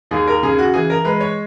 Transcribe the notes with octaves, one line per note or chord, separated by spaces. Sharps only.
D#2 G#4
A#4
C#3 G#4
F#4
E3 G#4
A#4
G#3 B4
C#5